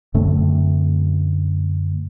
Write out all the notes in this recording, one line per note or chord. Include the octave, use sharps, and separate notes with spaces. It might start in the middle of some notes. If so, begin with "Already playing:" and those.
F#2 D3 A3 C4